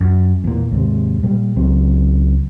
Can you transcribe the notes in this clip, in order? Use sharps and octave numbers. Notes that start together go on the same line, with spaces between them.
F#2
E2 A#2
D#2 G#2 C3
A#2 G3
C#2 F#3 C4